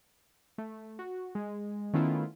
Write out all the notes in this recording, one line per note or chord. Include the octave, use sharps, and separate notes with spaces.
A3
F#4
G#3
D#3 A3 B3 C#4 E4 F4